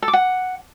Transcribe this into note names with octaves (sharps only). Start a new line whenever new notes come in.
A4
D6
F#5